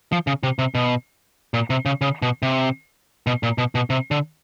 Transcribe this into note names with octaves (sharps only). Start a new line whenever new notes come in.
F3
C#3
C3
C3
B2
A#2
C3
C#3
C#3
B2
C3
B2
A#2
B2
B2
C3
D3